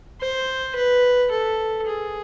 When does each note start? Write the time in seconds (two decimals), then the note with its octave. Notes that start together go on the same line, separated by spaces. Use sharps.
0.21 C5
0.76 B4
1.31 A4
1.86 G#4